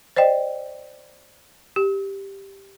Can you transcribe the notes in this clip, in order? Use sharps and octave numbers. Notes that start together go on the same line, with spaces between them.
C5 D5 D#5 G5
G4